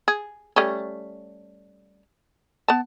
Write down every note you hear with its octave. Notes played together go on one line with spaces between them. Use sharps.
G#4
G3 A3 C#4
B3 A5